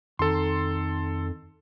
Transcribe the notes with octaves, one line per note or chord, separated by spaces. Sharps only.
F2 D#3 A4 C6